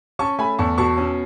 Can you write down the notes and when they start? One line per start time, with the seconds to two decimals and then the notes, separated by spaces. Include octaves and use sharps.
0.19 C#4 A5 C#6
0.39 A3 G#5 B5
0.59 E2 A5 C#6
0.78 B2 A5 C#6
0.98 C#4